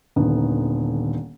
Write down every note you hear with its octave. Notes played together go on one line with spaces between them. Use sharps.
D#1 D3 D#3 B3